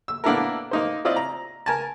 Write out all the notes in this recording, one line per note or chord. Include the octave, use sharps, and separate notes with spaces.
E6
A#3 B3 D4 E4 A4 A#4
A#3 D#4 C5
C4 E4 F4 D5 D#5
A#5
A#4 G#5 A5